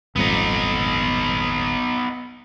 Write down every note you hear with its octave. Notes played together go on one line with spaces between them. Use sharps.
D#1 G#1 F2 B3 D#4